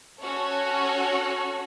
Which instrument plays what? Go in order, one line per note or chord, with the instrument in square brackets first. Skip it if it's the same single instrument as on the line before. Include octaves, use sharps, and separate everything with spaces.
[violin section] C#4 F#4 A4 C#5